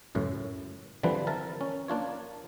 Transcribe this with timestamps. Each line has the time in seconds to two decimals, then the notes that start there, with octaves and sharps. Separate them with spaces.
0.15 C#2 F#2 A2
1.03 D3 E3 F3 G3 C4 B4
1.27 A#4 E5 A5
1.61 C#4
1.88 A#3 D4 F4 C#5